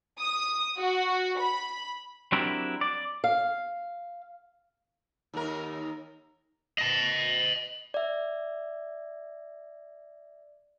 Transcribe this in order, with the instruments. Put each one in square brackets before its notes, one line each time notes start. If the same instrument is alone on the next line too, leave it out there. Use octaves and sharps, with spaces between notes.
[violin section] D#6
F#4
B5
[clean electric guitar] F#3 C4 D4 E4 G4 A#4
D5
[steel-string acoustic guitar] F5
[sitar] D#2 A#4
[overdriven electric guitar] D#5 A5
[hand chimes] D5 E5